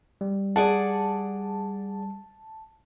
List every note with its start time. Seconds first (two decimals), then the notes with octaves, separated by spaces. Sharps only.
0.21 G3
0.56 G#4 D5 F#5 A5